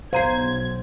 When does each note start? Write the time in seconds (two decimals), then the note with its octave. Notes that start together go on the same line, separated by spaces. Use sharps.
0.13 B1 C5 F5 A#5 G#6 C7